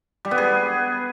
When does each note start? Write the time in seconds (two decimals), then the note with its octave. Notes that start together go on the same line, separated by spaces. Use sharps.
0.25 G3
0.31 B3
0.38 G#4